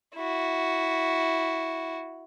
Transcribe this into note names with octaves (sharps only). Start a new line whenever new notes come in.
E4 F#4